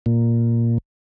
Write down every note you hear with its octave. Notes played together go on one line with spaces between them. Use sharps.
A#2